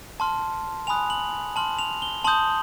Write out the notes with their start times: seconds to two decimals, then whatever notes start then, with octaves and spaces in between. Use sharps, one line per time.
0.20 A5 C6 F6
0.87 G#5 B5 D#6 F#6 F7
1.10 F#7
1.56 A5 C6 F6 F#7
1.79 F7
2.02 G7
2.24 A5 C6 D#6 G6 F#7